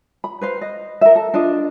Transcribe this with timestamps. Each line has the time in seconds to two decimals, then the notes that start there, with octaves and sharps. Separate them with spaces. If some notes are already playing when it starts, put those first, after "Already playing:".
0.24 B5
0.41 B4 C5 F5
0.61 D#5
1.01 A#4 E5
1.15 A4
1.34 D4 F4 D#5